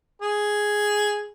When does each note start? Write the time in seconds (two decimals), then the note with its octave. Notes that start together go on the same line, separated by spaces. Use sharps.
0.22 G#4